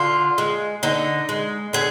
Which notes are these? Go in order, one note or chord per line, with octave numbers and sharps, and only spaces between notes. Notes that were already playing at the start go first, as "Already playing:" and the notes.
Already playing: D3 F4
G#3
D3 D#4
G#3
D3 G#4